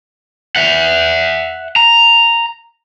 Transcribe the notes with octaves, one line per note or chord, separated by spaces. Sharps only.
E5 F#5
A#5